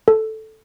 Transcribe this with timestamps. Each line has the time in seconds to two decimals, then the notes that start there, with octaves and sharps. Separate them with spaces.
0.08 A4